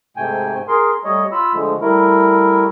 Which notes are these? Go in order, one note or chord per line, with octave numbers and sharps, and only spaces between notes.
G#2 C3 A3 G5 G#5
G#4 A#4 C6
G3 A3 C#5 D#5
F4 B5 E6
D3 F3 G#3 A3
G3 A3 E4 A#4